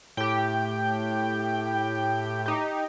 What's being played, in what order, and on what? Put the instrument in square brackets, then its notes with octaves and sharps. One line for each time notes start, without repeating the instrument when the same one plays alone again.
[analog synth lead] A2 [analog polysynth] G4 G5
[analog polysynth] D#4 G4